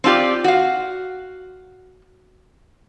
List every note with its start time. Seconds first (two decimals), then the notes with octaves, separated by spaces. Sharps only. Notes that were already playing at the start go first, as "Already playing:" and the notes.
0.04 C4 D4 F4 G4 D5
0.44 F#4 F5